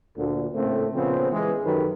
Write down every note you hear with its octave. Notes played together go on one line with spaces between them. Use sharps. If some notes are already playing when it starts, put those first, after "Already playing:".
D2 A#2 D3
A2 C#3 A3 A#3 C4
A#2 C#3 F3 B3 C4
E3 G#3
F#2 D#3 F#3 G4 A4 B4